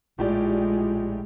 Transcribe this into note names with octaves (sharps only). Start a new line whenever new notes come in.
A#1 A2 G#3 F4 G4 D5